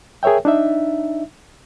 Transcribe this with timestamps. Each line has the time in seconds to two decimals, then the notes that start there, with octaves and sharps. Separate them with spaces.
0.23 G#4 A#4 C#5 E5 G5
0.45 D4 D#4 E5